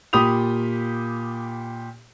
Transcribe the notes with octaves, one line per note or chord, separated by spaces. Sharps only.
A#2 G4 B5 D#6 G6 F7